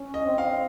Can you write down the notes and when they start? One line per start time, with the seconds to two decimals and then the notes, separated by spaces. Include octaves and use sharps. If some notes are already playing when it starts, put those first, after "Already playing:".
Already playing: C#4
0.14 D#5
0.26 C4
0.38 F5